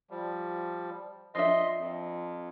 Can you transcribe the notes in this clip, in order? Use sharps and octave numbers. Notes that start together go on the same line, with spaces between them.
F3 G3
F3 D4 D#5 E5 C6
F2